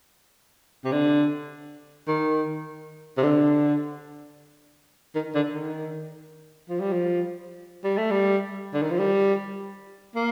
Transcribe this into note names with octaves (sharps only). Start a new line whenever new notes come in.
C3
D3
D#3
C3
D3
D#3
D3
D#3
F3
G3
F3
G3
A3
G3
D3
D#3
F3
G3
A#3